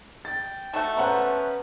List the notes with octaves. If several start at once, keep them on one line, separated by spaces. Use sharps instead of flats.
G5 A6
A3 F#4 A4
B3 C#4 B4 C5 F#5 A#5